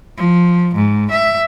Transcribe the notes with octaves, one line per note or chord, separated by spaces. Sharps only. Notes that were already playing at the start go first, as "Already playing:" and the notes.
F3
G#2
E5